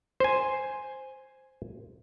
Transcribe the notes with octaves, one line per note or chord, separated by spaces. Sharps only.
C5 G#5